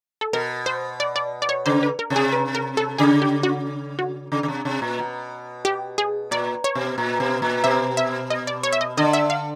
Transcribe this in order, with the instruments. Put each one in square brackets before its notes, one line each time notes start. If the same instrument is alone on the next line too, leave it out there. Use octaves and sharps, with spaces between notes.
[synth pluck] A4
[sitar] B2 [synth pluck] A#4
[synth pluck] C5
D5
D5
D5
C#5
[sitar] C#3 [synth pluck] C5
[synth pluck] B4
A#4
[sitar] C3
[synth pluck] G#4
B4
A#4
A4
[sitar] C#3 [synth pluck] G#4
[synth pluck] G4
F#4
F#4
[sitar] C#3
C#3
C3
C3
A#2
B2
[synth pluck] G4
G#4
[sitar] A#2 [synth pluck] D5
[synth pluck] C#5
[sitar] B2
A#2
B2
A#2
[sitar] B2 [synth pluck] E5
[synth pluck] E5
D#5
D5
C#5
E5
D#5
[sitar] D3 [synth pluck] D#5
[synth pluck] E5
F5